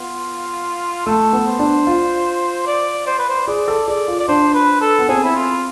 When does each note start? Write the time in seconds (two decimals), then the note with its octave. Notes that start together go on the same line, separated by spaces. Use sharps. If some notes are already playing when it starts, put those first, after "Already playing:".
Already playing: B3 F4
1.06 A3 A4
1.33 B3
1.47 C5
1.59 D4
1.87 F4
2.67 D5
3.07 C5
3.19 B4
3.29 C5
3.47 G#4 D5
3.68 A4
3.88 G#4 D5
4.08 F4
4.20 D5
4.28 D4 C5
4.54 B4
4.81 A4
4.99 B3
5.09 C4 G#4
5.24 E4
5.36 F4